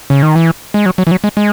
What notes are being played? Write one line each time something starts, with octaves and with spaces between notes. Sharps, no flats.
C#3
D#3
E3
G#3
F#3
F#3
E3
F#3
G#3
G#3